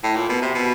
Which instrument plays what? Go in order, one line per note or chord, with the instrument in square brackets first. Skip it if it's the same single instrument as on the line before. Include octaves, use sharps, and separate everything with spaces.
[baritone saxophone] A2
A#2
B2
C3
B2